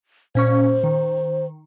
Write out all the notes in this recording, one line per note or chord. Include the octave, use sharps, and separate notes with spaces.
A#2 C#4 C5 C#6
D#3